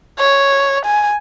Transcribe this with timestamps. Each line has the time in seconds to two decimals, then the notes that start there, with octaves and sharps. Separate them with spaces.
0.19 C#5
0.85 G#5